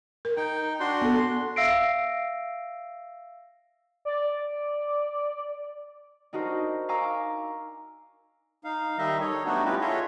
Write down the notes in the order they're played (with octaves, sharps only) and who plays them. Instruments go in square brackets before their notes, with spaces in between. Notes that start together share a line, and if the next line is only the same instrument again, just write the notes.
[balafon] A#4
[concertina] D#4 G5
D4 F#4 C6
[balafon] B3 A4
[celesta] E5 F5 E6 A#6 C7 D7
[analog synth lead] D5
[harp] D4 D#4 F#4 A#4 C5
F5 G#5 A#5 C#6 D6 E6
[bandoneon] D#4 F5
D#3 G3 D#4 D#5 E5
A4 C#5 D#5
G3 A3 B3 D4 D#4 F#4
B3 C#4 E4 F4 G4 B4
F4 G#4 A4 C#5 D#5 E5